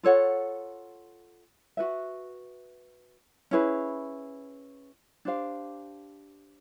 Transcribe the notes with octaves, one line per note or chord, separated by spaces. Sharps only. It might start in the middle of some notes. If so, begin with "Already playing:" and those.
F4 A4 C#5 F#5
F#4 B4 E5
C#4 E4 G#4 B4
D4 G4 C5 F5